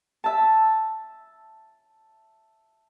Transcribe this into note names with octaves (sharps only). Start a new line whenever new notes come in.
E5 A5